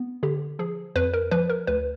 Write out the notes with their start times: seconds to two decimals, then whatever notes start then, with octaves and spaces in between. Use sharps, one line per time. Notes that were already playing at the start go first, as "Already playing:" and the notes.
Already playing: B3
0.23 D3 G4
0.59 F3 G#4
0.95 F2 B4
1.14 A#4
1.31 F3 B4
1.50 A#4
1.67 D2 B4